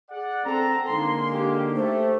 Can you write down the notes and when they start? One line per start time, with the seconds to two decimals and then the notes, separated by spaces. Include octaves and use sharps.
0.10 G#4 D5 F#5
0.45 C4 A4 A#5
0.88 D3 G#3 A#3 D#4 C6
1.33 G4
1.75 A3 G4 C5